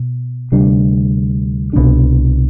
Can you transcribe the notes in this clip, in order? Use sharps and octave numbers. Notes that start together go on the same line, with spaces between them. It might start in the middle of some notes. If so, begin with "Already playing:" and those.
Already playing: B2
D2 C3 G3 D4
C2 B2 A3 D4